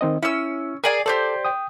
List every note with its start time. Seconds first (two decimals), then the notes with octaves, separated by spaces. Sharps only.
0.01 D#3 C4 D#5
0.23 C#4 E4 E6
0.84 G#4 A#4 D5 G#5
1.06 G4 A4 C5 D5
1.45 G5 D#6